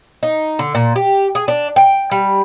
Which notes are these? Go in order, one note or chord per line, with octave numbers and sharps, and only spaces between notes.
D#4
D3
A#2
G4
G#4
D4
G5
G3